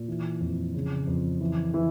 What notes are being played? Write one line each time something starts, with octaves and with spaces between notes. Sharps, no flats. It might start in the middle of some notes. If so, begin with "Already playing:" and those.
Already playing: A#2
E3
F2
C#3
F2
E3
E3